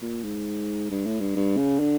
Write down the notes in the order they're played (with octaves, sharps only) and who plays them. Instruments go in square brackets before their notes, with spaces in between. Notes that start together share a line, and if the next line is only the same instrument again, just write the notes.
[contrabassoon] A#2
G#2
G2
A2
G2
G2
C#3
D3